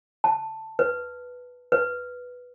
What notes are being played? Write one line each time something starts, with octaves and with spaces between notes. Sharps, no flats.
A5
B4
B4